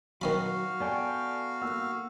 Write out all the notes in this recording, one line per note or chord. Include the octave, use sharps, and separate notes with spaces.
D#3 F#3 C#4 F#4 F5 B5
B3 A4 D5 G5 G#5 C#6
A#3 F#5 E6